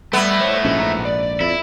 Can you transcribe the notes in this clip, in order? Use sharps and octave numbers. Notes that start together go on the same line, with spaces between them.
G3 A3 B3 E4
C5 C#5
A#1 G#2 F#3 C#4
B1 A#5
D5
F2 E4